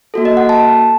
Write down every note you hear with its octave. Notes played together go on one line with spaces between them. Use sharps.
A#3 F#4 A4
D#5
F#5
A5